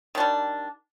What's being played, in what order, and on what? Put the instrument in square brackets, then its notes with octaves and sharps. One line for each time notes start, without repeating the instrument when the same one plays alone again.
[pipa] D#3
D4
G3